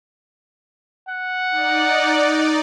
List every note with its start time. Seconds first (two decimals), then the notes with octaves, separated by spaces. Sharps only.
1.09 F#5
1.51 D#4 D5